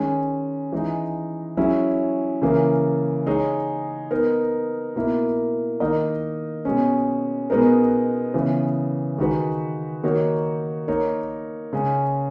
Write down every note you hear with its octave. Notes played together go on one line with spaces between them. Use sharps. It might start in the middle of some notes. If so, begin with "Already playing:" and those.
Already playing: D#3 G#3 C#4
E3 G#3 D#4
F#3 C#4 E4 G#4
C#3 E3 A#3
G#3 D#4 G#4 C#5
B3 D#4 A#4
B2 A#3 E4 A#4
D#3 A#3 D#4 A#4 D#5
B2 G#3 C#4
B2 G#3 B3 D#4 A#4
C#3 E3 B3
D#3 G#3 D#4 F#4 B4
D#3 A#3 D#4 F#4 C#5
A#3 D#4 A#4 C#5
C#3 G#3 C#4